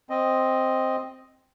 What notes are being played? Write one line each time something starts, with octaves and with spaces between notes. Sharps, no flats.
C4 D#5